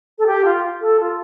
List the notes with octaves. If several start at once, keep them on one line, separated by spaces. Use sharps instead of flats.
A4
G4
F4
A4
F4